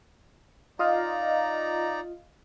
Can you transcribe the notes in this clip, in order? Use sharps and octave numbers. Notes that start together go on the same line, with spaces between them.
D#4 F4 D5 D#5 F5 A#5